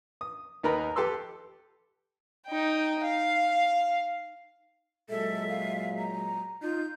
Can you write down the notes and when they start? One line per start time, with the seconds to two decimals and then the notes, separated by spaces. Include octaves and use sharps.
0.21 D#6
0.64 D#2 D#4 A#4 B4 A#5 B5
0.96 G4 A4 B4 C6 E6
2.47 D#4 G5
3.05 F5
5.09 A#2 F#3 G#3 A4 E5
5.49 F5
5.98 A#5
6.63 D#4 F4 G6